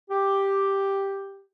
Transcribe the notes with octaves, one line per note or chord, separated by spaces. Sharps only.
G4